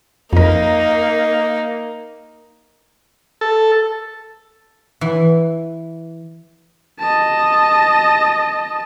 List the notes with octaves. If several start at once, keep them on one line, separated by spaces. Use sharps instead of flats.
F2 A#3 D#4 A#4
A4
E3
D#5 A5